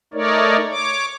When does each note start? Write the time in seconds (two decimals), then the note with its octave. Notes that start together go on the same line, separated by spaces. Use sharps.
0.14 A3 D#4 A#4 C#5 D5
0.71 C#5 D6